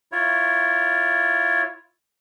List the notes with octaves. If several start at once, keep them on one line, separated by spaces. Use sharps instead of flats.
E4 F4 C#5